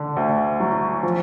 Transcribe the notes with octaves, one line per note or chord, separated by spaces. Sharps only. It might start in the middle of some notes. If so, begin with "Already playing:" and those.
Already playing: D3
D2
F#3
F3